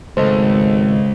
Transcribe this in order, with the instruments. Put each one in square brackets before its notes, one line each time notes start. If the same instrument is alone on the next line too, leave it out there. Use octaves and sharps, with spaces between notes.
[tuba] G#1 [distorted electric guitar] C#2 [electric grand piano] A3 A4 D#5 [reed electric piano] C5